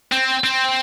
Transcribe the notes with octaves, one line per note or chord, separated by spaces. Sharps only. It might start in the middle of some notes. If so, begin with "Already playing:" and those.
C4
C4